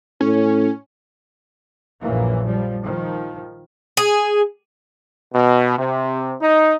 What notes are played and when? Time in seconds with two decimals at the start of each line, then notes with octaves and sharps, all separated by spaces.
0.21 A2 C#4
2.01 A#1 F#2 A#2 E3 A#3
2.44 F3 G3
2.83 D#3 F3
3.97 G#4
5.34 B2
5.78 C3
6.41 D#4